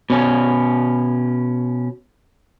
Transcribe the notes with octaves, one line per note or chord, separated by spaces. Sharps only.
B2 C#4